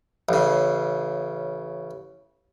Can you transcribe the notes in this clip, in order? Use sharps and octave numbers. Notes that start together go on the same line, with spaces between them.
A1 C#3